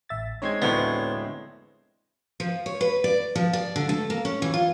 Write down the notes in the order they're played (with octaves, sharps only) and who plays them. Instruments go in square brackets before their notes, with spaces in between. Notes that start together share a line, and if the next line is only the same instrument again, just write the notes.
[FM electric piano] A1 E5 A6
[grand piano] G#3 C4 D#4 [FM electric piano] C#5 C6 G#6
[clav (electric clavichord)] D2 A2 [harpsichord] B3
[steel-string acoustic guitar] F3
C#5
B4
D5
F3
D5
D3
A3
A#3
C#4
E3
F4